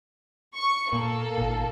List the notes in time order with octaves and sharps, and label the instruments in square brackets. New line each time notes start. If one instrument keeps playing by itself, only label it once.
[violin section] C#6
[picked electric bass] A#2 [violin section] A#3 A4
[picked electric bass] G#1 A#2